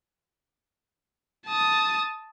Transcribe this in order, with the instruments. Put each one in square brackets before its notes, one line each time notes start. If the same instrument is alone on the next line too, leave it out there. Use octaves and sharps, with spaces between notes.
[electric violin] A5 D#6